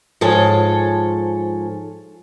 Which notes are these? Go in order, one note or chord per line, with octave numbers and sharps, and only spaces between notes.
G#2 F3 A4 C#5 G#5